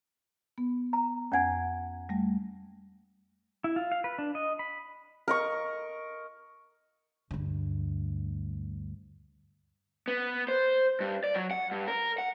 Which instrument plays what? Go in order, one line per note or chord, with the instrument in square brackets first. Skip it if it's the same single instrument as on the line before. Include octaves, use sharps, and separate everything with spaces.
[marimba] B3
[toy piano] A#5
[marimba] F2 G#6 [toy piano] C#4 F#5 G#5
[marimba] G3 A3
[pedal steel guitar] E4
F4
F5
B4
D4
D#5
B5
[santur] A#4 D#5 C#6
[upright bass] D2 G2
[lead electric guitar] B3
C5
G2
D5
F#3
F#5
G2
A#4
F#5